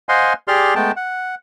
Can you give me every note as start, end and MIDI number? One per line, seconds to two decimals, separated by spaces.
0.09 0.33 72
0.09 0.33 75
0.09 0.33 77
0.09 0.33 78
0.09 0.33 80
0.09 0.33 84
0.48 0.74 67
0.48 0.74 68
0.48 0.74 74
0.48 0.74 84
0.48 0.74 89
0.75 0.92 56
0.75 0.92 57
0.75 0.92 59
0.75 0.92 79
0.75 0.92 81
0.96 1.35 78